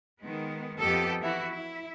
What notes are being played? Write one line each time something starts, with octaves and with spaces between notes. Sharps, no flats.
D#3 G#3 B3
F2 B3 G4 A4 D#5
E3 E4 F#4
E4